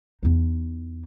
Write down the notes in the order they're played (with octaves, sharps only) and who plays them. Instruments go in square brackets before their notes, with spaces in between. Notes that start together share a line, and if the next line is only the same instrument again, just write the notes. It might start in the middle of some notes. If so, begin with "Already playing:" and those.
[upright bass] E2 D#4